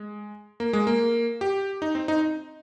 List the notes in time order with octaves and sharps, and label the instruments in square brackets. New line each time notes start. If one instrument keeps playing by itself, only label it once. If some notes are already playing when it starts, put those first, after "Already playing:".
Already playing: [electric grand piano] G#3
A#3
G#3
A#3
G4
D#4
C4
D#4